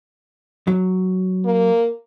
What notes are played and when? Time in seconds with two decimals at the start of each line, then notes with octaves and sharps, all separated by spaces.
0.67 F#3
1.45 A#3